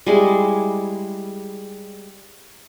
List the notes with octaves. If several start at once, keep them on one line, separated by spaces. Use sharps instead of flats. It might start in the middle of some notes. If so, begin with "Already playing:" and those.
G3 G#3 E4